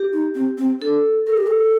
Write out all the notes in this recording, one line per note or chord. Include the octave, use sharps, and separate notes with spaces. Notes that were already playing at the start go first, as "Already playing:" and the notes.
Already playing: G4
D#4
C4
C4
D4 A4
A4 A#4
G4
A4